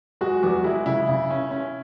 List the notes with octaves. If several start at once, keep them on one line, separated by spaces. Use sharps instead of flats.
G#3 F#4
E2 F#4
G#3 E4
C#3 E4
C#3
C#4
C#4